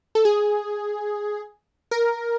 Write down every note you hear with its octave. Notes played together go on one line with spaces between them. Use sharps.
A4
G#4
A#4